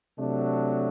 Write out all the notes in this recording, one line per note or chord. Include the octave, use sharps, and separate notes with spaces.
C3 F#3 A3 D4